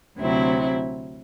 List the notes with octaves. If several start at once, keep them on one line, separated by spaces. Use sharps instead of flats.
D2 C3 F#3 C4 E4